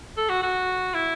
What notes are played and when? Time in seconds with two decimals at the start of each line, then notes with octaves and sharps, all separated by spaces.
0.17 A4
0.29 F#4
0.43 F#4
0.94 E4